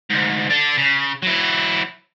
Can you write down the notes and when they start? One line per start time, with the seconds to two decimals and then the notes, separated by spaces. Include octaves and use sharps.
0.10 D2 G#2
0.49 D4 A4
0.77 C#3
1.23 F#3 E4